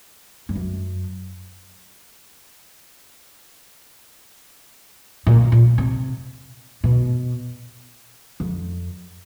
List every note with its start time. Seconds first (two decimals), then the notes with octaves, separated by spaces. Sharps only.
0.49 G2
0.55 F#2
5.27 A#2
5.52 A#2
5.78 C3
6.84 B2
8.40 F2